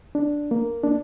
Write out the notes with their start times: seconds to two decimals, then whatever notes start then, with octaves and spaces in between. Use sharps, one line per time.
0.15 D4
0.51 A#3
0.83 D4